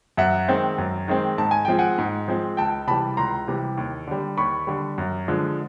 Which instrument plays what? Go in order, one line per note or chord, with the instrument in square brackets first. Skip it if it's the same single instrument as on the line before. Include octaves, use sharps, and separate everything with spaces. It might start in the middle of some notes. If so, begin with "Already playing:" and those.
[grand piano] F#2 E5 F#5
D#3 G#3 C4
F#2
D#3 G#3 C4
G#2 A5
G#5
F3 G#3 C4 G5
F#5 G#5
G#2
F3 G#3 C4
C#2 G5 A5
C3 E3 G3 A5 B5
C#2 A#5 C6
C3 E3 G3
D#2
D3 G3
D#2 B5 C#6
D3 G3
F#2
D3 F3 G#3